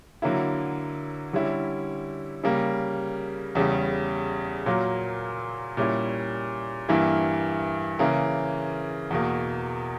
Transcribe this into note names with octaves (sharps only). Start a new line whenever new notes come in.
D3 F#3 A#3 E4
D3 G3 C#4 E4
C#3 G3 A#3
E2 C#3 G3
A#2 F#3 A#3
A#2 G3 C#4 E4
G2 E3 A#3 E4
C#3 E3 A#3
E2 B2 A#3